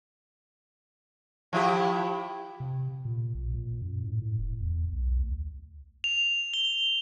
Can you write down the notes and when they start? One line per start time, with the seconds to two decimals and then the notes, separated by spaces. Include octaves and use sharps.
1.53 F3 E4 G4
2.60 C3
3.05 A#2
3.35 A#1
3.54 A#2
3.82 F#2
4.04 A2
4.22 A2
4.38 E1
4.60 E2
4.92 B1
5.19 D2
6.04 F7
6.54 G7